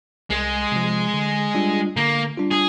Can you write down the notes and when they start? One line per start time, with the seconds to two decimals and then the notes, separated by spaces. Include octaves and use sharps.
0.30 C2 G#3
0.72 C3 F3
1.14 D3
1.55 G3 D4 F4
1.96 D3 A#3
2.38 G3 D4 F4
2.51 G#4